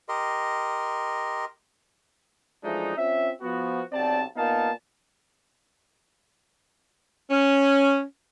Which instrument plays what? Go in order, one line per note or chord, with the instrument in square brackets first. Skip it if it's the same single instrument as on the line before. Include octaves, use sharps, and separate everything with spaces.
[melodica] G4 A#4 D#5 C6
[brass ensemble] E3 F3 G#3 A3 D4 D#4
C4 C#4 F4 E5
F3 B3 F#4
B1 C3 C4 C5 D5 A5
A#2 A#3 B3 D#4 F5 A5
[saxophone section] C#4